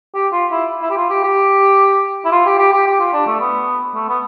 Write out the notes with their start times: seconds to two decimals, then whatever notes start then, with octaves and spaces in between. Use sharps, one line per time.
0.14 G4
0.33 F4
0.52 E4
0.82 E4
0.90 G4
0.97 F4
1.10 G4
1.23 G4
2.25 E4
2.32 F4
2.46 G4
2.59 G4
2.73 G4
2.87 G4
3.00 F4
3.14 D4
3.27 A3
3.40 B3
3.95 A3
4.09 B3